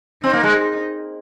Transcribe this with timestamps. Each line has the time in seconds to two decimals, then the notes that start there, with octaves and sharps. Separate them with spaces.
0.23 C4 D#4
0.33 A#3
0.43 G#3